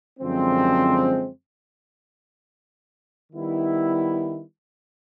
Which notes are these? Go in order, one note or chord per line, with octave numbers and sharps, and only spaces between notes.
F#2 D3 F3 G#3 C4
D#3 G3 B3 E4